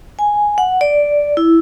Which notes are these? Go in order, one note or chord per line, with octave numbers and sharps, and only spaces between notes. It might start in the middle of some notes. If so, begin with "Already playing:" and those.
G#5
F#5
D5
E4